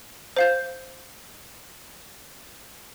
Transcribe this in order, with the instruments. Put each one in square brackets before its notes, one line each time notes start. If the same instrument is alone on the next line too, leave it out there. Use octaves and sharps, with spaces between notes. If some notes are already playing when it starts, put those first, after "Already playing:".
[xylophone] C5 F5 G6